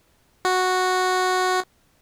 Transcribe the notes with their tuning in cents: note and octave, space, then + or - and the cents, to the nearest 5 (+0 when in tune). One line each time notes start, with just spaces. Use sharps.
F#4 -5